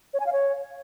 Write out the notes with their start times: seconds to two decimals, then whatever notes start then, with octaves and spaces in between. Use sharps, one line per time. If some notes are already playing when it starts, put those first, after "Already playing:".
0.14 C#5
0.20 G#5
0.26 F5
0.33 C#5